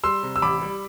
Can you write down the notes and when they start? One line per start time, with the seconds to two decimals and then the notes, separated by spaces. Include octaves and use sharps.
0.04 G3 C6 E6
0.23 C3
0.36 E6
0.42 A1 B5 D6
0.62 G3